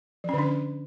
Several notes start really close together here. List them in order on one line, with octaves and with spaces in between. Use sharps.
F3 C#4 D3 D4